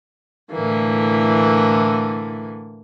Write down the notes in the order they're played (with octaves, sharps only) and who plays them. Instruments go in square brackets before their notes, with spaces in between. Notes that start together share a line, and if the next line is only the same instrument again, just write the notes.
[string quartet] A2 D3 E3 A#3